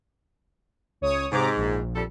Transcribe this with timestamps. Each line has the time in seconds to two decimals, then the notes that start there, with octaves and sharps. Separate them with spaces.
1.01 C#2 C#5 D#6
1.32 G#2 C3 A#5 D6
1.57 A#1
1.96 F2 G3 A4